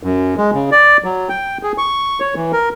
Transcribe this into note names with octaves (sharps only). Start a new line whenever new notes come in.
F#2
G#3
C#3
D5
F#3
G5
G#4
C#6
C#5
E3
A#4